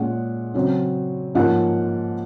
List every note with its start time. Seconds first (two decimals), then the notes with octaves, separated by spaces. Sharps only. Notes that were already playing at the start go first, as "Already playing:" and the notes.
Already playing: A#2 G#3 C#4 F#5
0.54 C#3 F#3 C4
1.35 G#2 F3 A#3 C#4 F#5